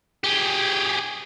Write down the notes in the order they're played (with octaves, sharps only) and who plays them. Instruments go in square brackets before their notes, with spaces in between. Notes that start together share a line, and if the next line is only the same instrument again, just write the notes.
[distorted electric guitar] G4 G#4